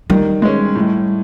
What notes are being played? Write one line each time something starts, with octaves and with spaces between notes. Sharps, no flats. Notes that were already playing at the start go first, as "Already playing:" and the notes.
D#3 G3
G#3 C#4
A2